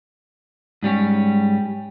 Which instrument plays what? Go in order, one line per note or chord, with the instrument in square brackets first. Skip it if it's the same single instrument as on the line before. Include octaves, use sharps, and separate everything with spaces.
[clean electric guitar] G#2 G3 C#4